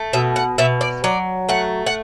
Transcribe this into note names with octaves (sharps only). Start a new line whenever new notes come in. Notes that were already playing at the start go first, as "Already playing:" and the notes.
Already playing: A3
B2 E5
F#5
B2 E5
D5
F#3 D5
A3 F#5
F#5